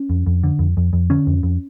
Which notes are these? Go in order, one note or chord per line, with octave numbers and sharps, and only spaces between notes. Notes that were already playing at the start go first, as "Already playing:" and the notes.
Already playing: C#4
F2
F2
D3
F2
F2
F2
D3 C#4
F2
F2